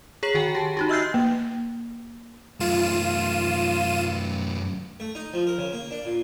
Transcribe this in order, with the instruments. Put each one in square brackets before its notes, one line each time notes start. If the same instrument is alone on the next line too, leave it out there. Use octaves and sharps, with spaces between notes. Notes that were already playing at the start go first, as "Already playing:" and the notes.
[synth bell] G#4 C#5 A#5 C7 F#7
D#3 F#4 G5 G#5
G4 A5
D#4 F#4 G4
D#5 E5 E6 F6 G6 C7
[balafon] A#3
[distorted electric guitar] F#2 A3 [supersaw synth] F4 D#7 E7
[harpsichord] A3
D#4
F3
A#4
C#3
A#3
D4
A#2